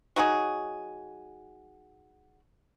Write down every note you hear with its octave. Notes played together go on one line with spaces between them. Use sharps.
F#3 D#4 F#4 G#4